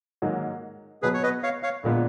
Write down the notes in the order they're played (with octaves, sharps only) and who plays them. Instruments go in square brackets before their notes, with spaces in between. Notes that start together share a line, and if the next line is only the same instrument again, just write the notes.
[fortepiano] G#2 D#3 F#3 A#3
[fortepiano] B2 F#3 B3 [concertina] G#4 B4
[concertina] C#5
B4 D#5
C#5 F5
C#5 F5
[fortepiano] A#1 A#2 G#3 B3